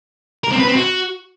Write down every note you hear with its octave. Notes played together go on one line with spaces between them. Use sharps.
A#4
C4
B4
C4
F#4